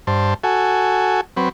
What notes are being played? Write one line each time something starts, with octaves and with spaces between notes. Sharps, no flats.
G2 C5 A5
F#4 A4 G#5
F#3 C4 B4